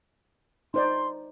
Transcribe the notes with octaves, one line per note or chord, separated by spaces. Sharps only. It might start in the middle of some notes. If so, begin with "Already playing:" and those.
D#4 C5 D5 C6